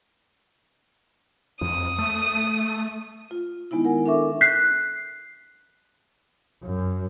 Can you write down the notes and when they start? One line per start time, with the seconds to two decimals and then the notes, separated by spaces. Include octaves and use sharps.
1.61 F2 D#6
1.99 A3
3.31 F4
3.71 D#3 G#3 B3 D#4 E4
3.85 A#4 F#5 G#5
4.06 D4 A4 A#4 E5 C#6 D6
4.41 F#6 G6 B6 C7
6.63 F#2